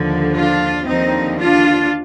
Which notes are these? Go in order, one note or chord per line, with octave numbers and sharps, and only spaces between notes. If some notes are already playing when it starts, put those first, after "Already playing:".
Already playing: D#2 D3 F3
D4 F4
D#2 D3 F3 C4 D#4
D4 F4